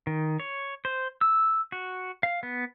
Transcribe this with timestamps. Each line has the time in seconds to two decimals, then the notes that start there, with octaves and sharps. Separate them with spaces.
0.07 D#3
0.40 C#5
0.85 C5
1.21 E6
1.72 F#4
2.23 F5
2.43 B3